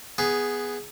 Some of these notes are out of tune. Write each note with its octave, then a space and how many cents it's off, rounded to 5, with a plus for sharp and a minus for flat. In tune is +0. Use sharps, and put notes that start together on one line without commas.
B3 +0 G#4 +0